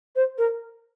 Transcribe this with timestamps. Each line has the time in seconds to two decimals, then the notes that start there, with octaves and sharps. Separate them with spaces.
0.16 C5
0.38 A#4